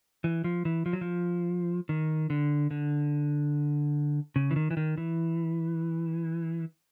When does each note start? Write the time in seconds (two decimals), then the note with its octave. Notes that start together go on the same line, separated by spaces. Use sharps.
0.24 E3
0.44 F3
0.65 E3
0.86 F3
0.93 F#3
1.01 F3
1.89 D#3
2.30 D3
2.71 D3
4.36 C#3
4.51 E3
4.56 D#3
4.71 E3
4.77 D#3
4.98 E3